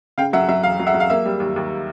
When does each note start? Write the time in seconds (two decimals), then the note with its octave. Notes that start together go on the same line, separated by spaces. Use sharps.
0.18 C#3 F5 G5
0.33 F#3 E5 F#5
0.48 F#3 E5
0.63 E1 F5
0.79 F#3
0.87 E5 F#5
0.94 F#3
1.00 F5
1.10 A#3 E5
1.25 G3
1.40 D#2
1.56 D#2